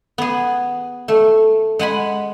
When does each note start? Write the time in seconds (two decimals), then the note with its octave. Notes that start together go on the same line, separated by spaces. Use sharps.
0.18 B3 G#4
1.08 A3
1.79 G#3 F#5 G#5 B5